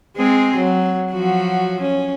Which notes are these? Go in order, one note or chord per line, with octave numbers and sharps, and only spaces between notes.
G#3 C4 G#4
F#3
F3 F#3 F#4
C#4